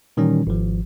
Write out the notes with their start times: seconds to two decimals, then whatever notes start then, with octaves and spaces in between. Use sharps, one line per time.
0.17 A#2 D#3 E3 G3 C#4
0.47 G#1 F3